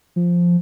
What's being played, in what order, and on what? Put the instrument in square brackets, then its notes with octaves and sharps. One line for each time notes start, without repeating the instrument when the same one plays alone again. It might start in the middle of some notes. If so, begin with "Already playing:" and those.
[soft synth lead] F3